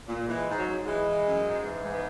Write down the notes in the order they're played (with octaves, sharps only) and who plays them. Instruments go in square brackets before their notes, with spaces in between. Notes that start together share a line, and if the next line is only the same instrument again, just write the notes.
[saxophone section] A#2
E3 G#3
G#2
F#3
G#2
E3 G#3
E3
F#2
G#2
E3
G#2
B3